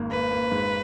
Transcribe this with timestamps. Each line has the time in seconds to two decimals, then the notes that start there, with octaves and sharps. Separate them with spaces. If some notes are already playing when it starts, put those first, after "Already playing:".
Already playing: G#1 G#2 A#3
0.11 A#3 B4
0.31 A#3
0.52 G#2